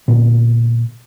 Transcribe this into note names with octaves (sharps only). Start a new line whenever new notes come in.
A#2 D3 B3